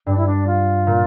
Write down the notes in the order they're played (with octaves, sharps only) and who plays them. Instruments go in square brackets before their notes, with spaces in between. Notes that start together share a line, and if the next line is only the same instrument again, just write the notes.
[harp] G2 [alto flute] D4
[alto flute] E4
D4
F4
[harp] A#2